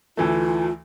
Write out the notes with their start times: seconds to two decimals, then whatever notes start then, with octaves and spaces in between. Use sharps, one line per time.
0.17 D2 E3 A3 F4